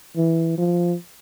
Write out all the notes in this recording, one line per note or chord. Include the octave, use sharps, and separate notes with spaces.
E3
F3